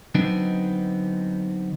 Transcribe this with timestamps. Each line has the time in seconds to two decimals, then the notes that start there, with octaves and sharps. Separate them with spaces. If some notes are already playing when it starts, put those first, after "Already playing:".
0.15 D3 F#3 B3 C4 D4 D#4